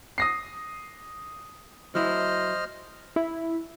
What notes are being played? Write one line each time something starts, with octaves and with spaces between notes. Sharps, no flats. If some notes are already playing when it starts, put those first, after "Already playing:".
D#6 A#6 C7
F#3 E4 C5 D#5 F6
E4